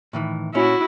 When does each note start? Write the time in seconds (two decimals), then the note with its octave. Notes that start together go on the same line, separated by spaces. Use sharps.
0.13 A2 D#3 E3
0.54 A#2 C#4 E4 F#4